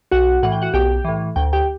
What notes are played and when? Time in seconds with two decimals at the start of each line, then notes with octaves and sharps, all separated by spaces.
0.11 B1 F#4 F#5
0.43 A2 E3 F#5
0.52 G5
0.62 F#4 F#5
0.74 B1 G4 G5
1.04 A2 E3
1.36 D2 G5
1.53 G4 G5